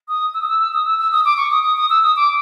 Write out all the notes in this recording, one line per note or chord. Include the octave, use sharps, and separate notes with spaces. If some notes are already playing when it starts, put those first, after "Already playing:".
D#6
E6
D#6
E6
E6
D#6
E6
E6
D#6
D6
C#6
D#6
D#6
D#6
E6
D#6
D6